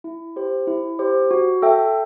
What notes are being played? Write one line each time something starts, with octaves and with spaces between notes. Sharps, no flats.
E4
G4 C5
E4
G4 C5
F#4
A4 E5 G5